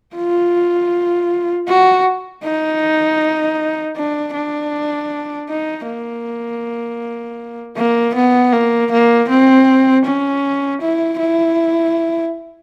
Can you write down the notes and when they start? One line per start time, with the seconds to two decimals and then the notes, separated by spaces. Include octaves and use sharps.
0.16 F4
1.67 F#4
2.44 D#4
3.96 D4
4.34 D4
5.49 D#4
5.87 A#3
7.76 A#3
8.15 B3
8.53 A#3
8.91 A#3
9.29 C4
10.05 C#4
10.81 E4
11.20 E4